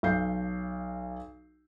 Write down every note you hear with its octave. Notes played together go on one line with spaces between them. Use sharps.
B1 F5 G6 C7